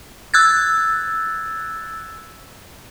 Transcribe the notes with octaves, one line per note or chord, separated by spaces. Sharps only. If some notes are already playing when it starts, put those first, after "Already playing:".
E6 F#6 G#6 A6